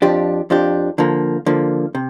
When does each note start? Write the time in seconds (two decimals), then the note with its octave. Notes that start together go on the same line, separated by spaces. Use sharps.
0.02 F2 F3 D4 G4
0.50 F2 F3 D4 G4
0.98 D3 F3 A#3
1.46 D3 F3 A#3
1.95 C3